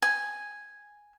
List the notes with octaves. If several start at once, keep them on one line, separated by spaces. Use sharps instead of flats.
G#5